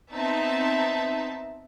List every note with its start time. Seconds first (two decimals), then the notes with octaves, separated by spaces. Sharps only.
0.12 B3 C4 D#4 E5 A5